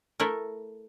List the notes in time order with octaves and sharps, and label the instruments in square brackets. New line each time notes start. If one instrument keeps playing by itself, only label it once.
[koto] A3 E4 A4 A#4